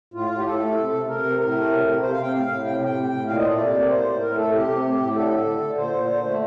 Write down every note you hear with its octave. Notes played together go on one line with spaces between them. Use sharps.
A2 F4
A2
G4
A2 A4
A3
C3
C3
C3 A#4
C3
A2 A#4
A3
C3
C3
C3 C5
F5
C3
G5
A2 F5
A2
C3 G5
C3
G5
A2
A2
A#2 F5
D#5
A3 C5
D5
C3
A#3
A2 C5
A2
A2 A#4
A3 A4
C3 G4
C3
A2
A2
D3 A4
D3
D3
D3
A#2 C5
A#2
D3
A3